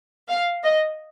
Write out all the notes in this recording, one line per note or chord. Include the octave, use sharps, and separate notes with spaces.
F5
D#5